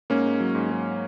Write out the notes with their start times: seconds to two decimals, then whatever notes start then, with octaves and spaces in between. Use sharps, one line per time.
0.10 G#2 A#3 C#4
0.25 G#2
0.40 F#3
0.55 G#2
0.71 G#2